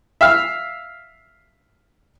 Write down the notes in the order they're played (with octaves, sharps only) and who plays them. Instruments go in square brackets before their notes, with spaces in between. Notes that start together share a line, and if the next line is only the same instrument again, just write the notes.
[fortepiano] E5 F5 F6